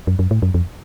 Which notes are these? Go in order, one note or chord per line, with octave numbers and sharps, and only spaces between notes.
F#2
F#2
A2
F#2
F2